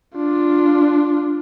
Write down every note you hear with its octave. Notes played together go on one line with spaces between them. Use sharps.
D4 F4